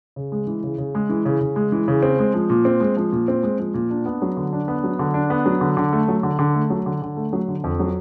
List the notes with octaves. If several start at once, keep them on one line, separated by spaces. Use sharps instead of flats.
C#3
G#3
E3
C#3
C#3
G#3
E3
C#3
C#3
G#3
E3
C#3
C4
G#3
F3
A#2
C4
G#3
F3
A#2
C4
G#3
F3
A#2
D4
B3
F#3
D3
D4
B3
F#3
D3
D4
B3
F#3
D3
D3
A3
F#3
D3
D3
A3
F#3
D3
D3
A3
F#3
D3
F2
F#3